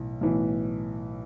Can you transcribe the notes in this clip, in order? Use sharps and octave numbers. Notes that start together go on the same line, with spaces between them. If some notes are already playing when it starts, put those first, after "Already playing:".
Already playing: B1 A2 E3
B1 A2 E3